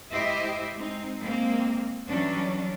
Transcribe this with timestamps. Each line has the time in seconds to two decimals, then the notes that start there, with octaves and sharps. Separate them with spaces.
0.11 G#3 E4 G4 C5 D#5 E5
0.74 G#3 C4 D#4
1.21 G#3 A#3 C4
2.09 E3 F#3 G3 C#4 D4